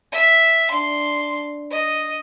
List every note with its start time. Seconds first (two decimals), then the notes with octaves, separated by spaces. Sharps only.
0.13 E5
0.70 D4 C6
1.71 D#5